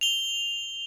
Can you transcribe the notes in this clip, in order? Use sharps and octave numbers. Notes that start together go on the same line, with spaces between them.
F7 G7